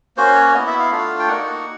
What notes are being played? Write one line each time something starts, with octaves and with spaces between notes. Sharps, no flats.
A#3 C#4 F#4 C5
C#5
B3 E4 D#5
E5
F5
A3 D4 F4
G5
A#3 D#4 F#4 F#5